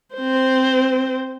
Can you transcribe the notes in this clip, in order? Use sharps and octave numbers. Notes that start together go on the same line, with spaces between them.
C4 C5